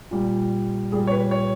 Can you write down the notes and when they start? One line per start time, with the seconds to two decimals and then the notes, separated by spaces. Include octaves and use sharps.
0.11 A#2 G3
0.92 A#2 G3 G#4
1.07 C#5
1.11 B4
1.31 C#5